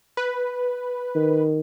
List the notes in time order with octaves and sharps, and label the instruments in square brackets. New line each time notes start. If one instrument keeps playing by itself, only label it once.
[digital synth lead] B4
[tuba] D#3